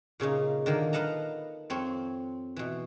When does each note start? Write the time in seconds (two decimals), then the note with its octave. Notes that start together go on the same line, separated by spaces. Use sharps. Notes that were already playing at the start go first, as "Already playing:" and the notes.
0.20 A#2 C#3 C#4 D#4
0.66 D3 D#3 A#3
0.93 B4 D#5 F5 F#5 A5 A#5
1.70 F2 C4 C#5
2.56 B2 E3